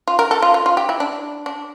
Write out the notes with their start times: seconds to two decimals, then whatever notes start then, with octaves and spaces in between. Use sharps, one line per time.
0.08 F4
0.19 A#4
0.31 A4
0.42 F4
0.54 F4
0.66 F4
0.77 G4
0.89 E4
1.00 D4
1.46 D4